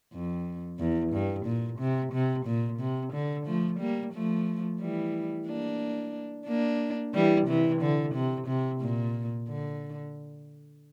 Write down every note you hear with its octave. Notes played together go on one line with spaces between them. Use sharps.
F2
E2
G2
A#2
C3
C3
A#2
C3
D3
F3 A3
G3 A#3
F3 A3
E3 G3
A#3 D4
A#3 D4
E3 G3
C3 E3
D3
C3
C3
A#2
D3